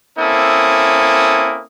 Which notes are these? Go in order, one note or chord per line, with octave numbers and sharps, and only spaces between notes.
A#3 C4 C#4 E4 A4 D#6